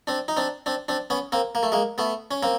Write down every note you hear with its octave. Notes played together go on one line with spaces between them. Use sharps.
C4 D4
D#4
C4 D4
C4 D4
C4 D4
B3 C#4
A#3 C4
A#3
A3
G#3 A#3
A3 B3
C#4
A#3 C4